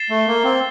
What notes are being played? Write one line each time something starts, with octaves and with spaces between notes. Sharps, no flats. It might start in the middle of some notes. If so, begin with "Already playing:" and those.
Already playing: A6 C7 E7 G7
A3
A#3
C4